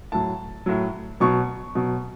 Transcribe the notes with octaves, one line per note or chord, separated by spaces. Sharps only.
A2 F#3 A5
A2 F#3
B2 F#3 C#6
B2 F#3